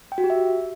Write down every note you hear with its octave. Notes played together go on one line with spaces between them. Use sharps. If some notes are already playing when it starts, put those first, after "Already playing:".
G5
F#4
G4
E5